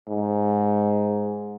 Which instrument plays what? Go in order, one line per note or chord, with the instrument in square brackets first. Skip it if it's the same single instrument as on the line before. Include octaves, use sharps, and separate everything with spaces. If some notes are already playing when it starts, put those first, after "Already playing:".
[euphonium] G#2